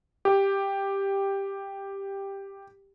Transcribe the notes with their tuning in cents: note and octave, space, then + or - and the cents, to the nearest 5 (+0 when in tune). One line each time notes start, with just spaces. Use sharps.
G4 +5